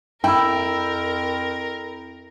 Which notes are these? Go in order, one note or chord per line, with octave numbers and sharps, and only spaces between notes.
F2 E4 A#4 G5 B5 E6